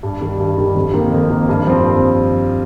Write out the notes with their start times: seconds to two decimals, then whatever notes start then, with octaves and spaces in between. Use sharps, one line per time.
0.03 G2
0.21 D#3 G3
0.40 G2
0.58 D#3 G3
0.76 F2
0.94 D#3 A#3
1.13 F2
1.31 D#3 A#3
1.49 G2
1.67 F3 C4